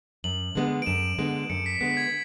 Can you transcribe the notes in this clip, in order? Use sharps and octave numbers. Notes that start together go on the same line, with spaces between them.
F#2 F#7
D3 G#3 B3
D7
F#2 E7
D3 G#3 B3
F#2 C#7
B6
D3 G#3 B3 B6
G#6